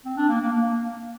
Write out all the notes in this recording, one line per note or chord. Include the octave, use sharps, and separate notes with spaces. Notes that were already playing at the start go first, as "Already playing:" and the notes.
C4
D4
A#3
A#3
A#3